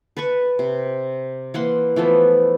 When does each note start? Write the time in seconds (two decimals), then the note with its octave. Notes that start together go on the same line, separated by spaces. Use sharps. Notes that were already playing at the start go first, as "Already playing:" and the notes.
0.17 B4 A5 B5 C#6
0.59 C3
1.54 E3 A#3 F#5 C6
1.96 E3 F3 A3 B3